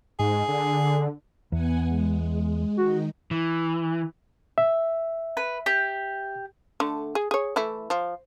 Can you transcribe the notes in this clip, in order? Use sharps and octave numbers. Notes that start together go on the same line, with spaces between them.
G#2 G#4
D3
E2 B3 F#5 G#5
G#3
D#3 D#4 F#4
E3
E5
B4
G4
D3 A3
G#4
G#4 C#5
E3 A3 E4
F3